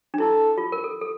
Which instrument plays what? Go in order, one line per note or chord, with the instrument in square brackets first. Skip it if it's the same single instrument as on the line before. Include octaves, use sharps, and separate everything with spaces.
[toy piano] D4
[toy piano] E4 [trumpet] A4
[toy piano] F4
A#4
A4
A4